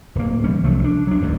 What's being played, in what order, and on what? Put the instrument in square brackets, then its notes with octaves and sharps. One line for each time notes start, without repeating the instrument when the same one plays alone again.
[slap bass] D1 A#3
E3 G3 C#4
C2 F3 F#3 A3
D4
F#3 D4
D1 G1 D#2 G#2